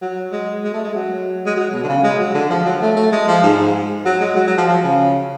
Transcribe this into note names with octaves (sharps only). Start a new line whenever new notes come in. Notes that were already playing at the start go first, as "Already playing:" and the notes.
F#3
G#3
G#3
A3
G#3
F#3
G#3
F#3
B2
D3
C#3
G#3
F#3
D3
F3
F#3
A3
A3
G#3
F3
G#2
F#3
G#3
F#3
F#3
F3
F3
C#3